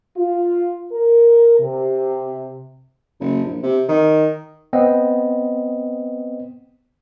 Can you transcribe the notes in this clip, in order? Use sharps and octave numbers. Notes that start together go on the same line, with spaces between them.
F4
A#4
C3
F#1
A#1
C3
D#3
B3 C4 D#5